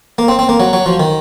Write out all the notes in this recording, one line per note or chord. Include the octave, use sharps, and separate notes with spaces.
A#3
C4
C4
A#3
F#3
F#3
F3
D#3